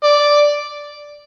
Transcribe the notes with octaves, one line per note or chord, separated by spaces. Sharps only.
D5